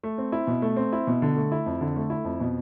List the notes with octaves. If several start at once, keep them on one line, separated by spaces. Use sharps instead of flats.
A3
C4
E4
B2
A3
C4
E4
B2
D3
A3
E4
F2
D3
A3
E4
F2
B2